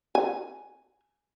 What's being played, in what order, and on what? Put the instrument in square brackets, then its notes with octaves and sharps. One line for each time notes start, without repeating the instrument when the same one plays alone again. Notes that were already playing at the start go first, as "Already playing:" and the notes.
[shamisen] G#5